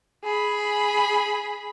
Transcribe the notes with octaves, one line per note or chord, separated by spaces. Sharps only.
G#4 B5